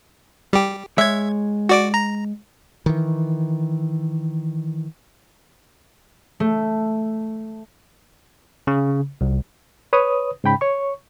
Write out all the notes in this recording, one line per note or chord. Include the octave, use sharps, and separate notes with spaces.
G3 G4
G#3 C#5 E5 G#6
F#4 D5 D6
A#5
D#3 E3
A3
C#3
C2
B4 C#5 D#6
G#2 C#3 G5 B5
C#5 C#6